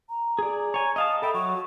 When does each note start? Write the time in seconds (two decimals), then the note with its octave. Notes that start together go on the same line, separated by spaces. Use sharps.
0.10 A#5
0.39 G#4 D5
0.74 C#5 G#5 A#5
0.96 D#5 F5 A5 D#6
1.22 A4 E5 G5 B5
1.34 F#3 C#6